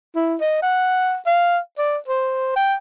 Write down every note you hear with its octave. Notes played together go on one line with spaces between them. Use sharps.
E4
D#5
F#5
F5
D5
C5
G5